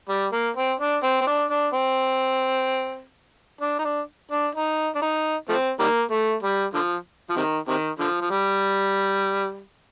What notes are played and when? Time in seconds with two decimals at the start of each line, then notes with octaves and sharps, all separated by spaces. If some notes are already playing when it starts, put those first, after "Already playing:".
0.09 G3
0.32 A#3
0.56 C4
0.79 D4
1.03 C4
1.21 C4
1.27 D4
1.50 D4
1.73 C4
3.61 D4
3.79 D#4
3.84 D4
4.31 D4
4.55 D#4
4.95 D4
5.02 D#4
5.49 F3 A3 C4
5.80 D#3 G3 A#3
6.11 A3
6.43 G3
6.74 D3 F3
7.30 F3
7.36 C3 D#3
7.68 C3 D#3
7.99 D3 F3
8.21 F3
8.31 G3